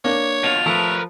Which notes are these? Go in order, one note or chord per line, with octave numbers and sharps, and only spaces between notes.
A#3 D4 C#5
B2 F4 F7
F3 A3 A#4 B4